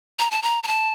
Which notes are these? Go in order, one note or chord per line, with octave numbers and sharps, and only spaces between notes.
A#5
A5
A#5
A#5
A5